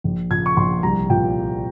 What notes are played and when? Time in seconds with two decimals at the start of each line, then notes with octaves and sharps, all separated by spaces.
0.04 A#1
0.30 A#2 G#6
0.46 C#6
0.57 A#1 C6
0.83 C2 A#5
1.10 A#2 G5